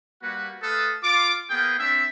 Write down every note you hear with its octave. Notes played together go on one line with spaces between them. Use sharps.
G3 A#3 F#4 B4 F#5
A3 A4 B4 F5 D#6
F4 D6
A#3 B3 G#4 F5 G5
C4 D4 E5